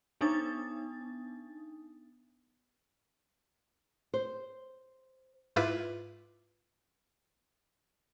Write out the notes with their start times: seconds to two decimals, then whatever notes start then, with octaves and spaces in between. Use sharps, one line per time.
0.21 B3 D4 D#4 D#6 A6
4.14 C5
5.56 G#2 E4 F4 B4 E5 D6